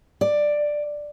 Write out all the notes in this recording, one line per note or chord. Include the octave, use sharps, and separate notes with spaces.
D5